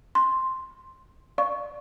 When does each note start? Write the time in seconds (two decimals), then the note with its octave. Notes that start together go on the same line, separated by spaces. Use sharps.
0.15 C6
1.38 D5 F5 C#6